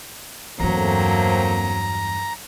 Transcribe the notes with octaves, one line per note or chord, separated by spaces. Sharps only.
E2 G2 F#3 A3 A#3 C4 A#5